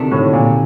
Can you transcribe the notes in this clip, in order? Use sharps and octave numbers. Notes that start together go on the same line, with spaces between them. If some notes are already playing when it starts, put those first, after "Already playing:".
Already playing: D2 C3 D#3 A3 D4
A2
A#2